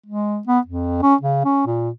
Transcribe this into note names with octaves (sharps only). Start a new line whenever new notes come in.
G#3
B3
F2
C#4
C#3
C#4
A#2